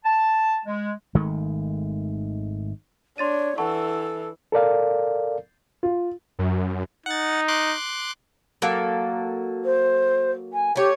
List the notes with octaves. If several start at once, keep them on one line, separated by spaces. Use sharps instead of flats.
A5
G#3
G#1 D#3 G#3 A3
D4 C#5 C6 A6 D#7
E3 A4 F#5 A5 C#6
A4 A#4 D5 F5
F4
F#2
D#4 F#5 A6
C6 D6 F#6
F#3 A#3 A4
C5
G#5
A3 G4 C#5